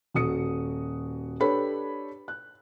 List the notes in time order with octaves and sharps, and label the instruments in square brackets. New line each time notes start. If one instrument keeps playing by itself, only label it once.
[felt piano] D#1 F#4 D#6 C#7
D4 G4 A4 B4 C#5 B5
F#6